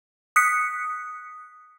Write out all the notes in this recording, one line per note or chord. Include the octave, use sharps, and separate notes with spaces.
D#6 F#6 B6 C#7